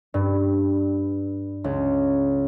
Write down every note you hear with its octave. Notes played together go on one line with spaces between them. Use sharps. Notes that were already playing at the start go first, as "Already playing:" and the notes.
G2
C#2